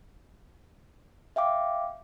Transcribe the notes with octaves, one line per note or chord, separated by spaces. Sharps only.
E5 F5 G5 D6